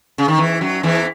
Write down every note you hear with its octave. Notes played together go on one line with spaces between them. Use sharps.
C#3
D#3
E2 E3
F#2 F#3
E2 E3